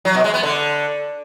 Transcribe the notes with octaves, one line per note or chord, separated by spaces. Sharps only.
F#3
B2
G#3
B3
D3